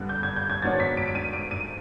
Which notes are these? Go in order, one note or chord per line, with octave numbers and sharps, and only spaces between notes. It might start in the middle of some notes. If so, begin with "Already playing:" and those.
Already playing: G2 D3 G3 B3 F#6
G6
G#6
G6
G#6
G#2 D#3 F#3 B3 D4 A6
B6
D7
D7
D#7
D7
D#7